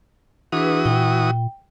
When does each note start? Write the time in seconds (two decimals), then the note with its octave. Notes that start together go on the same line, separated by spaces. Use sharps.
0.52 E3 D4 F#4 G#4 B4 D#6
0.85 A#2 G5